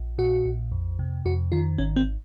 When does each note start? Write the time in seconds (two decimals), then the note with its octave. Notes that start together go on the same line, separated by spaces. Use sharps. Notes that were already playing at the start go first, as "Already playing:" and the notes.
Already playing: A#1
0.18 A#2 F#4
0.46 A#1
0.72 F2
0.99 C3
1.25 F2 F#4
1.52 D#3 F4
1.78 G#1 C#4
1.96 C4